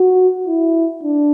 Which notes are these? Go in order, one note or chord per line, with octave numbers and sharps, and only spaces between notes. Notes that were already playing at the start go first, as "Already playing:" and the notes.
Already playing: F#4
E4
D4